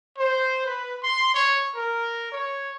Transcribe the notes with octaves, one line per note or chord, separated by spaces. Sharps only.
C5
B4
C6
C#5
A#4
C#5